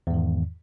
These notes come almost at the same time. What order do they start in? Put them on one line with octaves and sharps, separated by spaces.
E2 G#2 D#3